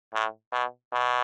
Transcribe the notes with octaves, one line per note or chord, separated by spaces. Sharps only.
A2
B2
B2